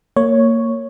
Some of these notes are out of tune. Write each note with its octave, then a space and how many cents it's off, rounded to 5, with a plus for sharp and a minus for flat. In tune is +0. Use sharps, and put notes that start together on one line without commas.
A#3 -20 C#5 +0